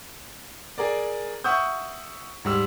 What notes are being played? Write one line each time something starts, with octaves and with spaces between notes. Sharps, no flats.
G#4 A#4 D5
E5 F#5 C#6 D#6 E6 G6
G#2 G3 E6